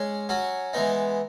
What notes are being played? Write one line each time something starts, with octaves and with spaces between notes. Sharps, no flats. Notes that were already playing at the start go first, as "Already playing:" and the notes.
Already playing: G#3 C#4 G#4
F#3 C#4 F#4
E3 G#3 B3 D#4